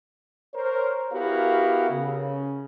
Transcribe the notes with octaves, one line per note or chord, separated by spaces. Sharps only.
A#4 C5 C#5
B3 E4 F#4 G4 A#4 F5
C#3